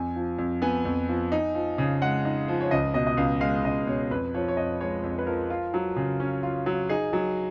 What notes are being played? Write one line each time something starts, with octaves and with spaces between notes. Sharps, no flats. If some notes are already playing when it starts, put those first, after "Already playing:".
Already playing: F2 G#5
F3
F2
B3 G#5
F2
F3
D#4
F3
C#3
G#3 F#5
D#4
F3
C#5
C#2 D#5
B2 D#5
D#5
C#2 F5
G#3 F5
C#2 D#5
B2 C#5
F2 B4
F3 C#5
C#5
F2 D#5
G#3 C#5
F2
B4
F3 A#4
F4
F#3
C#3
C#4
F4
F#3
D#4 G#4
F#3